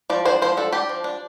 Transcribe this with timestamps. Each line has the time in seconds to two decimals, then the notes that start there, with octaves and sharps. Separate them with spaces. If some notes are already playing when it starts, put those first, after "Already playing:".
0.10 F3 D5
0.25 D4 C5
0.42 F3 C5
0.57 D4 A4
0.72 D4 G4
0.89 F3
1.04 D4